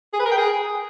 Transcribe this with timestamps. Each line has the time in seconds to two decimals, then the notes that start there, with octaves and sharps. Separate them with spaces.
0.13 G#4
0.19 B4
0.25 A#4
0.31 G5
0.37 G#4